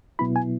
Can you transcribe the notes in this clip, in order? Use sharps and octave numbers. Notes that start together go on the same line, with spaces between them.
B2 F#3 B3 E4 B5
G#5